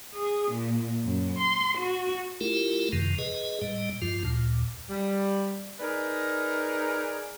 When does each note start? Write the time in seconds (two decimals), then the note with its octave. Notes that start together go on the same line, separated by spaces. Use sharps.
0.14 G#4
0.52 A#2
1.04 F#2
1.38 C6
1.77 F#4
2.41 A3 E4 F4 G4 A#4
2.93 F#2 C3 D#3 F3
3.19 G#4 B4 D#5
3.62 A2 G3 D#5
4.02 G2 F3 F4
4.25 D2 A#2
4.90 G3
5.80 D#4 G#4 A#4 B4 D5